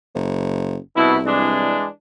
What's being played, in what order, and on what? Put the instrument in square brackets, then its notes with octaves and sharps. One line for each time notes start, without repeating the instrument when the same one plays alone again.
[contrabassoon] F#1
[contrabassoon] C2 [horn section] B2 E4
[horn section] E3 G#3 D4